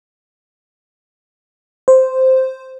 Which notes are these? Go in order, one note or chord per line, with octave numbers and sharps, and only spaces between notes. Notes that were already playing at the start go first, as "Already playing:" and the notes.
C5